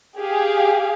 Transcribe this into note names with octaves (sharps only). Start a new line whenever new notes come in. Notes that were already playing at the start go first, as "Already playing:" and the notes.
G4 G#4 F5